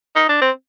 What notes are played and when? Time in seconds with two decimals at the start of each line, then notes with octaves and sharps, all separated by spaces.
0.16 D#4
0.29 D4
0.41 C4